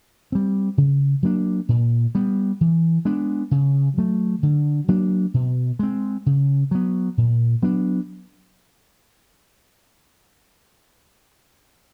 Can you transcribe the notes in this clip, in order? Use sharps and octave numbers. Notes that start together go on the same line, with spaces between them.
G3 C4
C#3
F#3 A#3 D4
A#2
G3 B3
E3
G#3 B3 D4
C#3
F#3 A3
D3
F#3 A#3 D4
B2
G#3 C4
C#3
F#3 B3
A#2
F#3 B3 D4